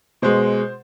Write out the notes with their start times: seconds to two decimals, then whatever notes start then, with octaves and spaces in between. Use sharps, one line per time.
0.22 B2 G#3 C5